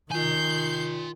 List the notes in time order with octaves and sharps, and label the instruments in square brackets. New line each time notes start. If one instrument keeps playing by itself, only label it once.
[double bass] D#3 [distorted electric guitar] F4 G#5 [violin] G6 C7